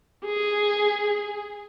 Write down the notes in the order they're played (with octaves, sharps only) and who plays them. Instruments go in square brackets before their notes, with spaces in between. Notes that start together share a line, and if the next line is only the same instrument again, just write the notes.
[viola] G#4